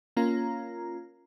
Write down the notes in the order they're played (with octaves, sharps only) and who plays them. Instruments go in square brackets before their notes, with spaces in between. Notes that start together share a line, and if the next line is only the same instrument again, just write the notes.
[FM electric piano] A#3 C#4 F4 A#5